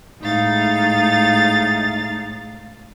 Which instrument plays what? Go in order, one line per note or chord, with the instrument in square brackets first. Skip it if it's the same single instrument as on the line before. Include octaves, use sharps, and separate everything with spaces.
[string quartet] A2 G#3 D#4 F5 A6